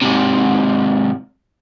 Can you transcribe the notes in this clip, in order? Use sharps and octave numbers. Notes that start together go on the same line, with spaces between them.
G#2 C3